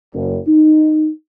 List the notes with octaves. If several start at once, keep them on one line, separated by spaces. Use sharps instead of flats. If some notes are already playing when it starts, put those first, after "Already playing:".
F#1
D#4